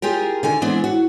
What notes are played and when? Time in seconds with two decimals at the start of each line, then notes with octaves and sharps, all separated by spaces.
0.02 F4 G4 G#4 A#4
0.43 D3 D#3 G#5
0.62 E3 G#3 B3 C4 D4
0.84 F#4